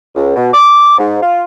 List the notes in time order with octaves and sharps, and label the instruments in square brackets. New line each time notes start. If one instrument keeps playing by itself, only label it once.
[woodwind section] C#2
B2
D6
G#2
F4